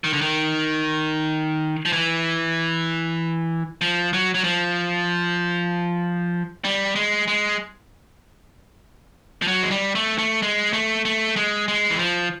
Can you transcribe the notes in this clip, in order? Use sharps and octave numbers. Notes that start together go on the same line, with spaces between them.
D#3
D3
D#3
F3
E3
F3
F#3
F#3
F3
G3
G#3
G#3
F3
F#3
G#3
G3
A3
A3
G#3
A3
A3
G#3
G#3
E3
F3